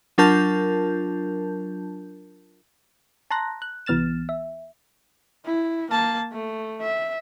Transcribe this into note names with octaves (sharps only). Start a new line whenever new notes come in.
F#3 D4 F4 A#4 A5 G6
A5 A#5 C6 F#6 A#6
F#6
C2 E3 B3 F6 A6 E7
E5
E4
A#3 A5
A3
E5